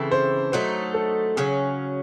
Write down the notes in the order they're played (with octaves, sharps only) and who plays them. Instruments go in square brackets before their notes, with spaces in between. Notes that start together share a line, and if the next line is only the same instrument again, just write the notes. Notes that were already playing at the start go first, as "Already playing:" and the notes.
Already playing: [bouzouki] C#3 E3 C4 E4 [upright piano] A4
[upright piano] C5
[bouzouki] F#3 A3 D#4 [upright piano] C5
[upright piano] A4
[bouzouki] C#3 F#3 C#4 [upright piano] G#4